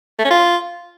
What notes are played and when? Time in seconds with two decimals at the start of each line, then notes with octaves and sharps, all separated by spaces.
0.19 A3
0.25 C#4
0.31 F4